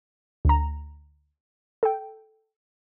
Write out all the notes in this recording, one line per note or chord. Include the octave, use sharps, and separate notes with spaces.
D2 A#5
A4 G5